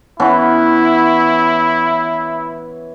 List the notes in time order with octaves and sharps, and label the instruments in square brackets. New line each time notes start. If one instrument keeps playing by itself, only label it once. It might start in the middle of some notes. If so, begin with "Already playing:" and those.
[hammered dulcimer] E3 B3 C#4 [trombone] E4